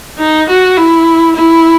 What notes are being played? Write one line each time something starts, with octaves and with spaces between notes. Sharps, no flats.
D#4
F#4
E4
E4